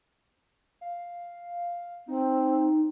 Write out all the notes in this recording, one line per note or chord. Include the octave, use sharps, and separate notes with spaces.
F5
C4 D#4